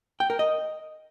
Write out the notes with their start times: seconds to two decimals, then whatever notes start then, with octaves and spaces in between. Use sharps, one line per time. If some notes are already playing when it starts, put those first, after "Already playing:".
0.20 G5
0.30 A#4
0.39 D#5